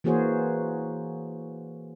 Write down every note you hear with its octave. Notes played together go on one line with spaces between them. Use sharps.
E3 A#3 F#4 G#4 C5 C#5